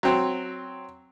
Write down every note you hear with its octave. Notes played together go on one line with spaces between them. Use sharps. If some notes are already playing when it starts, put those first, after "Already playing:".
F#3 C4